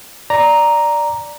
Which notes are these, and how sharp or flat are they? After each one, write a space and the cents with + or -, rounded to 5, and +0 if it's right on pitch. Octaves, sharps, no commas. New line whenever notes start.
D5 +0 A#5 +0